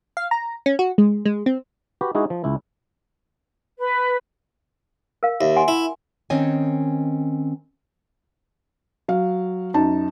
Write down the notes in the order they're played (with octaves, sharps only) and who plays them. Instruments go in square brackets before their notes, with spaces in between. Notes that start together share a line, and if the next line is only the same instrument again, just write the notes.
[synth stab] F5
A#5
C#4
F#4
G#3
G#3
C4
[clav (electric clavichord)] F#4 G4 B4
G#3 D#4 E4 F#4 G#4
F3
C#2 E4
[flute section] B4
[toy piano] A#4 F5
[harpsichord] D#2 [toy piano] E5
[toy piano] F#5 G#5 C6
[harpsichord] E4
[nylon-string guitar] D#3 C4 C#4 C#5 D#5 G#5
[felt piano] F#3 F5
F#2 D#4 A5